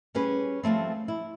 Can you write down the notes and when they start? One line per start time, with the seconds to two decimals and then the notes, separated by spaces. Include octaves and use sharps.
0.15 G3 C#4 G#4 B4
0.63 F3 G3 A3 C4
1.08 E4